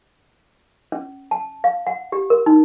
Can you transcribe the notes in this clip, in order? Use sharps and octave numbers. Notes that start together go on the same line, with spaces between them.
C#4
A5
F5
F#5
G4
A#4
D#4